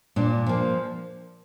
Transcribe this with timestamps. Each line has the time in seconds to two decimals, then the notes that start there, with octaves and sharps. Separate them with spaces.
0.16 A#2 D4
0.46 F3 A#3